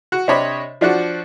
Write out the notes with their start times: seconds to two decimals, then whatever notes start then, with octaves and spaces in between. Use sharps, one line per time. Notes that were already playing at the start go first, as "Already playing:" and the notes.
0.12 F#4
0.28 C3 D4 C5 C#5 D#5 B5
0.81 F3 D4 F#4